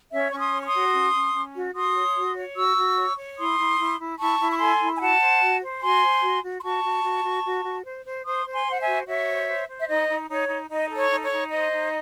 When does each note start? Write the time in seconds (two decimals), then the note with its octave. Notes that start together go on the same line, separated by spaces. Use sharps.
0.12 C#4 C#5 E5
0.32 C#4 C#6
0.39 C6 D#6
0.52 C#5
0.61 C#6
0.66 C6 D#6
0.73 F#4
0.94 C#4
1.14 C#4
1.34 C#4
1.54 F#4
1.75 F#4 C6 D#6
1.95 C#5
2.15 F#4
2.35 C#5
2.56 F#4 C#6 E6
2.77 F#4
2.97 C#5
3.17 C#5
3.37 E4 C6 D#6
3.58 E4
3.78 E4
3.99 E4
4.19 E4 A5 C#6
4.39 E4
4.51 C#6
4.59 A4 G#5 C6
4.80 E4
4.96 G#5
5.00 F#4 F#5 A5
5.21 C5
5.40 F#4
5.61 C5
5.81 F#4 G#5 C6
6.02 C5
6.22 F#4
6.42 F#4
6.58 C6
6.63 F#4 A5 C#6
6.84 F#4
7.04 F#4
7.24 F#4
7.44 F#4
7.64 F#4
7.85 C5
8.05 C5
8.25 C5 C6 D#6
8.46 C5
8.52 G#5 C6
8.66 C5 F#5
8.80 E5 G#5
8.87 F#4
9.07 F#4 C#5 E5
9.28 C5
9.48 C5
9.68 C5
9.81 E5
9.88 D#4 D#5
10.09 D#4
10.29 D#4 C#5
10.49 D#4
10.70 D#4 D#5
10.90 A4
10.97 C#5
11.10 D#4
11.24 C#5
11.31 D#4
11.51 C5 D#5
11.72 D#4